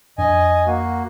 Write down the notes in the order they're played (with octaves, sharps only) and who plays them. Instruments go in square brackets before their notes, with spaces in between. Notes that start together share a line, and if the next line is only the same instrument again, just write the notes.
[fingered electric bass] F2 D4 [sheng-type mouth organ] D#5 G#5
[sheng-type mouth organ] A#3 F#4